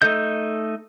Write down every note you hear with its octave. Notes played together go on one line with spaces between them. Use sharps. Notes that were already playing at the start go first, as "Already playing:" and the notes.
A3 D#4 A4 D#5 G6